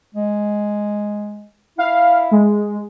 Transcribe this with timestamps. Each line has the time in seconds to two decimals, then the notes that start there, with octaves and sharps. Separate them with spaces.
0.15 G#3
1.78 E4 F5
2.31 G#3